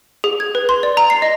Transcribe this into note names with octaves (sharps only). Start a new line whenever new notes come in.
G#4
G#6
B4
C6
D5
A#5
C7
D#5